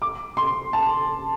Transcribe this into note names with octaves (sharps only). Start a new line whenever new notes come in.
D6
C6
A5